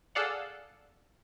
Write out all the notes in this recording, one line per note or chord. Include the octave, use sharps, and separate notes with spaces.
G#4 A4 D5 F5 F#5